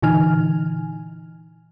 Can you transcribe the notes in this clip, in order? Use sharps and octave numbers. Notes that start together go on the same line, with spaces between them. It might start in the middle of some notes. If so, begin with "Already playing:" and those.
A#2 D3 E3 D#4 G#5 F6